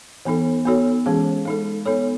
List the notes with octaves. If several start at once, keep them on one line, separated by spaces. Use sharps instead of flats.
E3 B3 D#4 A4
B3 D#4 F#4 A4 C#5
E3 G#3 C#4 G#4
G#3 D#4 A4
B3 D#4 A4 C#5